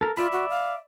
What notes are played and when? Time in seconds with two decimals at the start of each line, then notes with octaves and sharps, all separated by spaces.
0.01 A4 A#4
0.17 F4 D5 E5 B5
0.32 F#4
0.49 F5